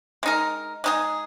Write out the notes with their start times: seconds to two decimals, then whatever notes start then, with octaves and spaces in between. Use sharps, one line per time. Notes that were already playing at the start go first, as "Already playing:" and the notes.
0.23 G#3 D#4 A#4
0.84 G#3 D#4 G#4